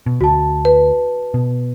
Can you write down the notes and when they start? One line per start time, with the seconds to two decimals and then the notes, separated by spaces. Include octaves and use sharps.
0.06 B2
0.21 D2 F#4 A5
0.65 B4
1.34 B2